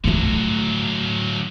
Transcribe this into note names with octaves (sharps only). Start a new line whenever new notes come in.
D3 F#3 A3 F4